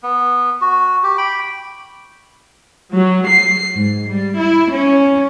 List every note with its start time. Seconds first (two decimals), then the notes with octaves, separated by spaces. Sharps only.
0.03 B3
0.61 F#4
1.04 G4
1.18 G5 B5
2.92 F#3
3.27 C7
3.76 G#2
4.08 G3
4.39 E4
4.73 C#4